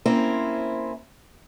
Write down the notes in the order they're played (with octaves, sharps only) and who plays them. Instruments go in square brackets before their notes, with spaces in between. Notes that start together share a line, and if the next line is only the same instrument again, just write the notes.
[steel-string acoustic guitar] A#3 C4 C#4 E4 C5